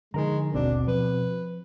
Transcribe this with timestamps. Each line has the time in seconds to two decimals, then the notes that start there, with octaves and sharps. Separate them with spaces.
0.14 D3 F3 G#3 D#4 A#4 A#5
0.53 G#1 D#2 B2 C4 D4 F#4
0.87 F3 B4